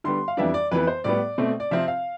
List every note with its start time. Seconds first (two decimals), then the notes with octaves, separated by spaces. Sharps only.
0.04 D3 G3 B3 C6
0.28 F5
0.37 F2 E3 G3 B3 D4 E5
0.54 D5
0.71 F2 E3 B3 B4
0.87 C5
1.04 A2 G3 B3 D5
1.38 B2 A3 C4
1.60 D5
1.71 C3 F3 C4 E5
1.88 F5